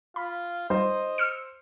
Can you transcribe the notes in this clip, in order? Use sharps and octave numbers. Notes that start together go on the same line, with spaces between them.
F4 B5
G3 D#4 C5 D#5
E6 F6 C#7